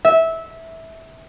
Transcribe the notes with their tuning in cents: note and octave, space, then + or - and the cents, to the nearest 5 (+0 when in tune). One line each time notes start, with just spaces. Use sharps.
E5 -15